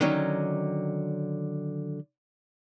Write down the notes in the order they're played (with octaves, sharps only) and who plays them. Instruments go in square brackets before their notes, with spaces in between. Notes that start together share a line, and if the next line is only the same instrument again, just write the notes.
[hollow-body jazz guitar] D3 D#3 F#3 C#4 D#4